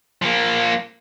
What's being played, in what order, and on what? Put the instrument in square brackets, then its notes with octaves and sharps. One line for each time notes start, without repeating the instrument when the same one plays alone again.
[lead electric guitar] F3 A#3